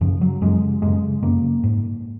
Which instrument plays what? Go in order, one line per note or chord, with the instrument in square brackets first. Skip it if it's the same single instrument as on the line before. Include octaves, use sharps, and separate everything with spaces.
[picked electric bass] F#2 C#3 F3
F#3
F#2 C#3 G#3
F#2 C#3 G#3
F#2 C#3 A#3
G#2